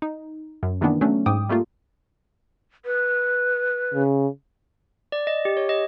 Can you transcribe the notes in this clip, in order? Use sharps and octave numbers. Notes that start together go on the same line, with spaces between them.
D#4
F#2
C3 D#3 E3 A#3 B3 D4
F#3 A3 C#4 D4
G#2 G5 D6 D#6
G3 A3 A#3 F4
B4
C#3
D5
D#5
G4
C#5
D#5